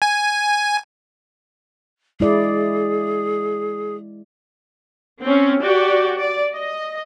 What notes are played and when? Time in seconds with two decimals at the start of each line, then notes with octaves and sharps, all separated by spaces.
0.02 G#5
2.20 G#3 E4 G#4 D5
5.22 C4 C#4
5.61 F#4 G4 D5
6.19 D5
6.53 D#5